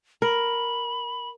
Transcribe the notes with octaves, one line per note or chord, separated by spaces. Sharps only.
A#4 B5